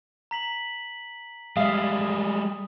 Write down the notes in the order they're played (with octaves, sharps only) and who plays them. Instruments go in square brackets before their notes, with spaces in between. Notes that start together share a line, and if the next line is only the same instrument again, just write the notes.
[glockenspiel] A#5 B6 F#7
[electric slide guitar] G3 G#3 [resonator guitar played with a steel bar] E5 F5 [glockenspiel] D#6